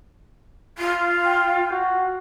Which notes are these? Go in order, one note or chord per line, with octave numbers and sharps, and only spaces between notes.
F4
G5
F#4